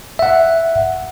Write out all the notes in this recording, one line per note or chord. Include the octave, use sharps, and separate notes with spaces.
E5 F#5